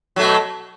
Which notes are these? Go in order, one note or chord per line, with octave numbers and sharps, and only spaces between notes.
B2 F#3 A3